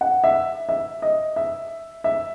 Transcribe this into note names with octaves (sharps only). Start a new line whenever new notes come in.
F#5
E5
E5
D#5
E5
E5